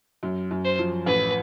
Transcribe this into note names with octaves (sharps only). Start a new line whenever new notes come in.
F#2
F#2
C5
F3
A1 B4